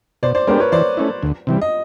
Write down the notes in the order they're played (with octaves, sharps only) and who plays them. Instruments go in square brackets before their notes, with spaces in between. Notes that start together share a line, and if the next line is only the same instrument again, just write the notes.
[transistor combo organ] B2 [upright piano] C5 D5
[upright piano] C5 D5
[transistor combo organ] G#3 B3 D4 G4 [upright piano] A#4 C5
[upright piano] B4 C#5
[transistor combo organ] E3 [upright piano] C5 D5
[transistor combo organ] A3 C#4 E4
D2
C3 E3 G3
[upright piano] D#5